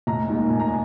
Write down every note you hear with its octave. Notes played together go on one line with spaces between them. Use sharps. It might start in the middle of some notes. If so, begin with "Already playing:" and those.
F1 A#5
D#2 D#3 G#3
F1 G#5
A#5
G#5